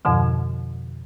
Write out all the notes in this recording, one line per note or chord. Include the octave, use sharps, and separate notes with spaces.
F2 G#2 B2 D3 F3